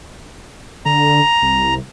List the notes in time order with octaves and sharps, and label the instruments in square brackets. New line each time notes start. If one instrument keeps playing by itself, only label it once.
[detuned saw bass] D3 [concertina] A#5
[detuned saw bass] C2